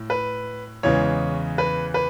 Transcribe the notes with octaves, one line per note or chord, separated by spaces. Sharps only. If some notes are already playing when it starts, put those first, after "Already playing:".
Already playing: A2
B4
E2 C#3 E3 G#3 C#5
B4
B4